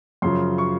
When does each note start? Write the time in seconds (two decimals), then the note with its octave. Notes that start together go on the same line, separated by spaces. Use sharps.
0.22 F#2 C#3 F3 C6
0.58 C#6